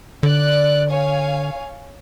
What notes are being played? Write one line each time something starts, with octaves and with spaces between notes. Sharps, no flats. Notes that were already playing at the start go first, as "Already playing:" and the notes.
D3 D5 F#6
C#5 F5 G#5